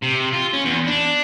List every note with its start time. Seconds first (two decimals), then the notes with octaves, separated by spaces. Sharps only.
0.03 C3
0.33 F4
0.54 C#4
0.65 E2
0.87 D4